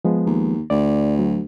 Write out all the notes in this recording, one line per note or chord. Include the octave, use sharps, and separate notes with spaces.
F3 G#3 B3
D#2
D2 D5
F#3